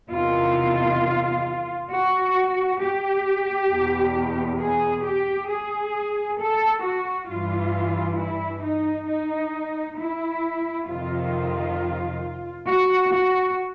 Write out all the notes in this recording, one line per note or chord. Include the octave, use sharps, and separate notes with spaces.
E2 C3 D#3 F4
F#4
G4
E2 B2
G#4
G4
G#4
A4
F#4
G2 E3 F4
E4
D#4
D#4
E4
F2 C3 D#3 F4
F#4
F#4